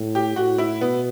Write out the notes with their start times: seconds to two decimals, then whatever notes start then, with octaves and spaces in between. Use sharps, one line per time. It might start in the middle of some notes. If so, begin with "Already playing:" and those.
Already playing: A2
0.15 G4
0.36 A2 F#4
0.58 E4
0.80 B2 B3